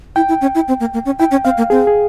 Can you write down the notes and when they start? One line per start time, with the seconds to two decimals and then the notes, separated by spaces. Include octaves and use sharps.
0.16 E4 G5
0.29 E4
0.41 C#4
0.55 E4
0.68 C4
0.80 A#3
0.94 A#3
1.05 C#4
1.19 E4 G5
1.31 C#4
1.44 C4 F5
1.58 A#3
1.70 C4 G#4
1.87 G#4